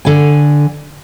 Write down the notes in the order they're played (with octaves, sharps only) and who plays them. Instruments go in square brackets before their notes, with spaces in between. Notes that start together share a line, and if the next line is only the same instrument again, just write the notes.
[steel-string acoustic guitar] D3 G#5